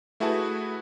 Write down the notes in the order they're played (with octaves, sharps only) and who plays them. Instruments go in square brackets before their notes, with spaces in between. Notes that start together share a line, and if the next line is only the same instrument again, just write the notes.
[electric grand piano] A3 E4 F#4 G#4 B4 A5